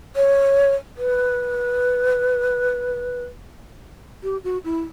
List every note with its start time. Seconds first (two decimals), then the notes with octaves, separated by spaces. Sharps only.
0.15 C#5
0.97 B4
4.22 G4
4.43 F#4
4.64 E4